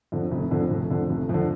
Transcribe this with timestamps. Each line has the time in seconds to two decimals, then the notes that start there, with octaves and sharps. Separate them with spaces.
0.12 F2 D3
0.31 F1
0.51 F2 D3
0.71 F1
0.90 F2 D3
1.10 F1
1.29 F2 D3